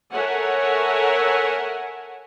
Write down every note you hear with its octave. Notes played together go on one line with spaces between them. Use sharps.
A4 A#4 C#5 E5 F#5 G#5